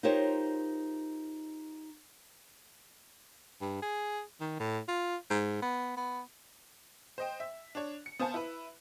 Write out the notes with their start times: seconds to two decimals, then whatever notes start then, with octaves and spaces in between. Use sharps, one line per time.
0.03 D#4 F4 G4 A#4 C5 C#5
3.61 G2
3.82 G#4
4.41 D#3
4.60 A2
4.88 F4
5.30 G#2
5.62 B3
5.97 B3
7.18 C5 D#5 G5
7.40 E5
7.75 D4 C#5
8.06 C#7
8.19 B3 C5 F5 G#5 A5
8.34 E4 B4